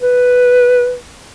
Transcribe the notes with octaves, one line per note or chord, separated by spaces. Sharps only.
B4